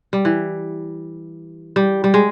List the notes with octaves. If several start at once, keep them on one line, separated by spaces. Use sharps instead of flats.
G3
E3
G3
G3
G#3